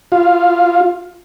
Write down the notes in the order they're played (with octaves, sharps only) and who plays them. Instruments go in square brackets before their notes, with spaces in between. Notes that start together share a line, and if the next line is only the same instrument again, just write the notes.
[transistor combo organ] F4